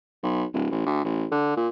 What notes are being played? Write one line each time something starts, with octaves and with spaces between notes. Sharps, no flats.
B1
D1
A1
D2
A1
D3
A#2